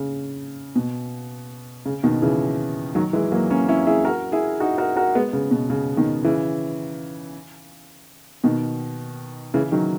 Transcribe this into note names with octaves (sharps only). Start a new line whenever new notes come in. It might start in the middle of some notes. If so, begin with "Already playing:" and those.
Already playing: C#3
B2
C#3
B2 D#3
C#3 E3
D#3 F#3
E3 G#3
F#3 A#3
A#3 C#4
C#4 E4
E4 G#4
F#4 A#4
E4 G#4
D#4 F#4
F#4 A#4
F#4 A#4
G#3 B3
C#3
B2
C#3
B2 D#3
C#3 E3
B2 D#3
C#3 E3
D#3 F#3